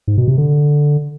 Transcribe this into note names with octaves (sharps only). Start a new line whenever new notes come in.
G#2
B2
C3
D3